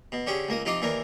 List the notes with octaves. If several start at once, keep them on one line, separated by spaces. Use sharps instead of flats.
B2
D3 C#4 G4 G#4
C#2 A#3 D#6
C3 F3 D#4 F4 C6 D6
D#2 E3 D4 A#4